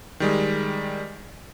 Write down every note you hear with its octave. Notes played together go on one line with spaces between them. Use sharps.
D#3 G3 G#3